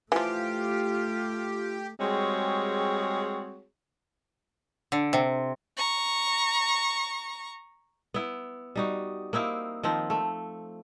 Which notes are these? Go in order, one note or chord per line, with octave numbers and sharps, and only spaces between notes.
E3 F3 A3 F4 G4
G3 G#3 C4 F#4 G#4 C#5
D3
C3
A#5 C#6
B3 E4
G3 D#4 F#4
A#3 C4 D#4 E4
D#3 F3 C4
A3